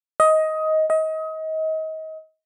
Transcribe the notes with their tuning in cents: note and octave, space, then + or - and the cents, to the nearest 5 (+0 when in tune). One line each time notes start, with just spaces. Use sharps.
D#5 +15
D#5 +30